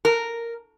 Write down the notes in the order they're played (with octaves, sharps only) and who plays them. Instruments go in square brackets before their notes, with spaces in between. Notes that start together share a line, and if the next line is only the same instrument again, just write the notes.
[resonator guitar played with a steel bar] A#4